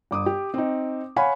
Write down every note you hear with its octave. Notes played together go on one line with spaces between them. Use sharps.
G1 D6 D#6
G4
C4 D#4
C#5 F5 F#5 G#5 B5